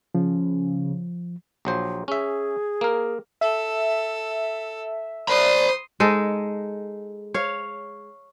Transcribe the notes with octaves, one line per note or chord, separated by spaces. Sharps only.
C#3 F3
A#1 F#3 C5
C#4 G#4 E5
A#3 A#4
A4 E5
C5 D5 B5 C6 D#6
G#3 D#4 A4
C#5 F5